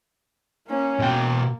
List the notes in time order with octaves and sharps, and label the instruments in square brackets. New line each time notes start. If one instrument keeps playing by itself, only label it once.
[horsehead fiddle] A#3 C#4
[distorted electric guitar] B2 G5 [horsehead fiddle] A#3